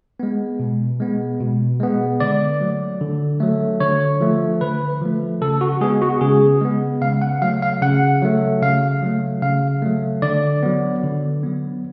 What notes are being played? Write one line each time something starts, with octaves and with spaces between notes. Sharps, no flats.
G#3 B3
B2
G#3 B3
B2
G#3 B3
D3 D5
F#3 A3
D3
F#3 A3
D3 C#5
F3 A3
D3 B4
F3 A3
C#3 A4
F#4
G#3 B3 G#4
F#4
C#3 G#4
G#3 B3
C#3 F5
F#5
F#3 A3 F5
F5
C#3 F#5
F#3 A3
C#3 F5
F#3 A3
C#3 F5
F#3 A3
D3 D5
F#3 B3
D3
F#3 B3